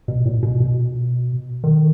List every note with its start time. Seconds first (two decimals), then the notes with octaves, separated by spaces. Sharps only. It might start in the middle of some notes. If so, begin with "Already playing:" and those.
0.08 B2
0.25 A#2
0.43 B2
0.60 B2
1.64 D#3